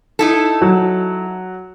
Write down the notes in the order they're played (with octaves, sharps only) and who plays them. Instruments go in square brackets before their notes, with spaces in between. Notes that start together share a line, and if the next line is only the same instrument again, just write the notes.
[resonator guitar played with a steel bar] D#4 E4 A4
[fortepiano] F#3